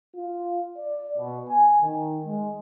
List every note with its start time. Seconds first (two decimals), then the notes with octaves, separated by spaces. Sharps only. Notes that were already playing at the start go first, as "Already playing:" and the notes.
0.16 F4
0.77 D5
1.18 B2
1.49 G#5
1.82 D#3
2.25 G#3